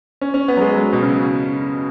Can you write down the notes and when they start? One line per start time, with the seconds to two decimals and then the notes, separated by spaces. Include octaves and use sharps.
0.21 C#4
0.34 C#4
0.48 B3
0.57 F#3
0.61 G#3
0.75 F#3
0.93 B2
1.02 C#3